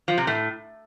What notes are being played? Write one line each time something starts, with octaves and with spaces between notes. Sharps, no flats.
F3
C3
A2